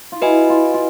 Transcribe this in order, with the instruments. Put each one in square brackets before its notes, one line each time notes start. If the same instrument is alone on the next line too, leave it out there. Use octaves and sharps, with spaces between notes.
[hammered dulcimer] F4
[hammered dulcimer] E4 [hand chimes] F#4 B4 D#5 G#5
[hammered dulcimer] F4
F4